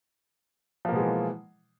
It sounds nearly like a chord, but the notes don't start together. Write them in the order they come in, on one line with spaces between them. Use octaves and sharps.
F3 A#3 B2 G#3 E3